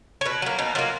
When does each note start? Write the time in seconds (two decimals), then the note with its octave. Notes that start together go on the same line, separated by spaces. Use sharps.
0.21 C#5
0.26 B2 B4
0.42 F#3 A#3
0.59 B2 D#4
0.75 F#3 A#3 F4